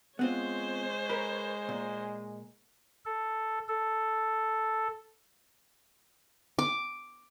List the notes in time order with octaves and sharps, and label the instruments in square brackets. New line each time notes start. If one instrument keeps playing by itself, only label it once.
[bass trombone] G#3 [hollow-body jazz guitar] B3 C4 F4 [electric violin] C5 C#5
[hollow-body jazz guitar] A#4 B4
A#2
[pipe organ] A4
A4
[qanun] D6